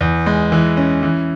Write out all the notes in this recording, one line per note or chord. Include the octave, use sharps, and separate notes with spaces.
E2
G#3
E3
C#4
E3